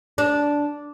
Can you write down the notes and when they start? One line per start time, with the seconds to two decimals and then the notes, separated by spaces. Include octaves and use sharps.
0.18 D4